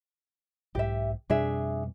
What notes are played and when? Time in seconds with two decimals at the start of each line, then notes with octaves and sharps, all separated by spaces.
0.75 B1 G#2 G4 E5
1.30 F2 B2 G3 D4 G#4 E5